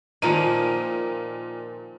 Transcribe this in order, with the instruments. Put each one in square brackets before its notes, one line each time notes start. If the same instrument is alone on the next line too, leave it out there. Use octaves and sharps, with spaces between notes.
[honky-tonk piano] A#2 D#7 [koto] D#3 F3 A#3